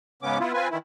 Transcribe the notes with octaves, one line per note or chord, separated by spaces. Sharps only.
G#2 C#3 B3 C#4 D6
B3 E4 F4
C4 F4 B4 G#5
D#3 E3 E4